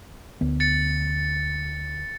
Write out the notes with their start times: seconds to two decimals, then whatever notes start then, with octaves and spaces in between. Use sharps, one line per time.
0.41 D2 B3
0.60 A6 C#7